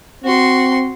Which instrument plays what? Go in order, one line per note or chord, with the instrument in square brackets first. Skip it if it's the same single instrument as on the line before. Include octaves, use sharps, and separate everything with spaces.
[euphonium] C4 [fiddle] F#4 C6